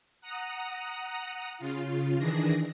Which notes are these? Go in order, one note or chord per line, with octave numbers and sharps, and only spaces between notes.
F#5 A#5 D#6
C#3 F4
D#3 E3 D4 G#4 A#6